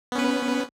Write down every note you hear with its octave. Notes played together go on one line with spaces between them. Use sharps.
B3 C#4 B4